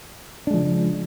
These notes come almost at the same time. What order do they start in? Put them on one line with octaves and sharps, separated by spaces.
D4 G#3 F3 C#3